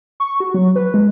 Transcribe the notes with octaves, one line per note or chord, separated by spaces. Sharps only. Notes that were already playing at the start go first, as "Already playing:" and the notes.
C#6
F#4
F#3
B4
G#3